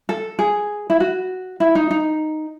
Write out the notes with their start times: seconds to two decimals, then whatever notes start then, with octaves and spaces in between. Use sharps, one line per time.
0.09 A4
0.39 G#4
0.90 E4
1.00 F#4
1.60 E4
1.75 D#4
1.91 D#4